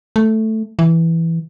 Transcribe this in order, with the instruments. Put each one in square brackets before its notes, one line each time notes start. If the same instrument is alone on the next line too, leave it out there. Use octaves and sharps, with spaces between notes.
[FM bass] A3
E3